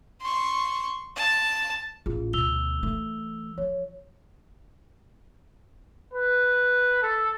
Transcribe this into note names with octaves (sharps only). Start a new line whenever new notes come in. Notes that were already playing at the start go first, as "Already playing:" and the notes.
C6 C#6
A5
A1 F4 G#4
D2 B2 E6 F7 G7
E3 A3
F3 C#5
B4
A4